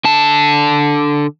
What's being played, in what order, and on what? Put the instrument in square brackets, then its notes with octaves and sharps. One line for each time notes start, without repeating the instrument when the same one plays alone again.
[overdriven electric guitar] D3 A5